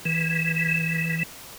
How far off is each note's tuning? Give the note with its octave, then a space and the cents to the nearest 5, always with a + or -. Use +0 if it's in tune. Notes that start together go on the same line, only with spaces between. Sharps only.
E3 -15